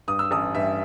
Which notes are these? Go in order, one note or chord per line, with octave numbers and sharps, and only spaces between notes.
G2 D#6
E6
A1 D#6
G2 E5